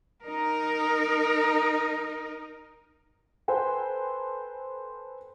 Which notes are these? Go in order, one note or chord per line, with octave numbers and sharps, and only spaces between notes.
D#4 A#4
A4 B4 C5 G5 G#5